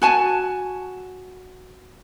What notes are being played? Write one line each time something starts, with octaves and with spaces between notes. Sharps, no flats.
F#4 G#5 A5